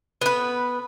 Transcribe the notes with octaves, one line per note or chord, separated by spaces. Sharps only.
B3 B4